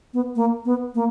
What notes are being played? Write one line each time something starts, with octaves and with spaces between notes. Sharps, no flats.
B3
A#3
B3
A#3